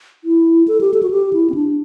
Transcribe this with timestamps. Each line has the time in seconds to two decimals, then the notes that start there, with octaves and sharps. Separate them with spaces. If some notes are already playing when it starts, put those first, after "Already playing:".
0.24 E4
0.68 A4
0.81 G4
0.94 A4
1.03 F#4
1.11 G4
1.33 E4
1.50 C4
1.54 D4